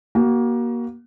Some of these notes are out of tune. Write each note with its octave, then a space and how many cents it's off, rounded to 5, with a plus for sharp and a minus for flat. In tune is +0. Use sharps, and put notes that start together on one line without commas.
A#3 +25 F#4 +35